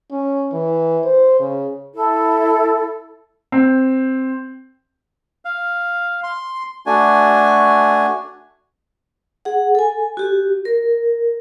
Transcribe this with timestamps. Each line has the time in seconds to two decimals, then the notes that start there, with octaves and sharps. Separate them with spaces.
0.11 C#4
0.53 E3
1.04 C5
1.40 C#3
1.95 E4 A4
3.52 C4
5.45 F5
6.23 C6
6.86 A3 D4 F#4 G#5
9.45 G#4 F#5
9.75 A4 G#5
10.17 F#4 G4
10.65 A#4